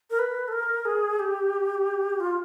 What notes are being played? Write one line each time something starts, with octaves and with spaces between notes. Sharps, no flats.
A#4
B4
A4
A#4
G#4
G4
F4